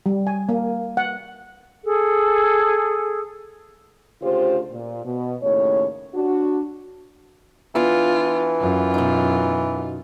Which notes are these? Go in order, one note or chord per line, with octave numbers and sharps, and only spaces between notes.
G3
G#5
A#3
F#5
G#4 A4
D2 C#3 F4 G4 C5
A#2
B2
D#2 A2 C#3 C#5
D4 F#4
E3 B3 D4 F4
F#2 F4
B2 D#4